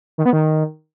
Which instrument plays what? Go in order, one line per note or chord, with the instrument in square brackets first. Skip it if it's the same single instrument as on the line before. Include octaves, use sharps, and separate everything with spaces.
[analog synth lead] D#3
B3
D#3